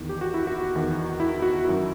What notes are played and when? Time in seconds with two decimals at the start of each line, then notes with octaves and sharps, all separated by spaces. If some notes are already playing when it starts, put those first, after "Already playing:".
Already playing: E2 D#3
0.09 G4
0.21 F#4
0.34 E4
0.47 F#4
0.76 E2 D#3
1.20 E4
1.42 F#4
1.65 F#2 D#3 E4